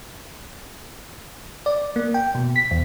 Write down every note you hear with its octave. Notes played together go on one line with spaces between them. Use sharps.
D5
A#3
G5
B2
B6
E2